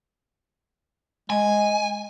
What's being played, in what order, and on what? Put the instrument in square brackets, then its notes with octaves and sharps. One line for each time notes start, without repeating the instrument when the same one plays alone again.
[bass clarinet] G#3 [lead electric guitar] G#5